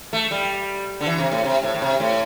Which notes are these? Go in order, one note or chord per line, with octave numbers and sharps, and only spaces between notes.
A3
G3
D3
E3
C3
A2
C3
A2
A2
C3
A2